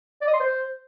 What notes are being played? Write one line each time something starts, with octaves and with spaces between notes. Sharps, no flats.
D5
D#5
C6
C5